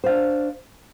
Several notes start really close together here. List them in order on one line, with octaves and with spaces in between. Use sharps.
C5 F5 D4